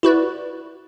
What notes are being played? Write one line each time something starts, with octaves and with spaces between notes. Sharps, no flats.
E4 F#4 B4 D5